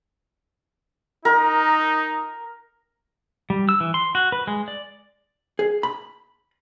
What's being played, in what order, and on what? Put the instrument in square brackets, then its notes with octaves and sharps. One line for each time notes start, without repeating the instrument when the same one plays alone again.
[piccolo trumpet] D#4 [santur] A#4
[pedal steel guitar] G3
E6
E3
C6
F#4
B4
G#3
D5
[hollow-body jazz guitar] G#4
B5